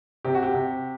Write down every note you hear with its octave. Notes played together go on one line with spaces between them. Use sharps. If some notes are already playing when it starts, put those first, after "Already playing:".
C3 G4
F#4
G4
C3